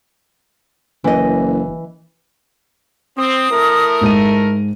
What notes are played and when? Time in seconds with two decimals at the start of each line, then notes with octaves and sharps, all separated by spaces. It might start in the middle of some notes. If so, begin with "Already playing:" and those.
1.04 F#1 E3 D#5
3.18 C4 D#6
3.50 A3 E4 A#4
4.01 G#2 G#3 D#7